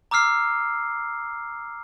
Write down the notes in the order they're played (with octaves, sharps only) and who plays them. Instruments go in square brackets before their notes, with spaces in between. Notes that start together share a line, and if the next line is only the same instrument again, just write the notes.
[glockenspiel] A#5 D6 E6 F6 C7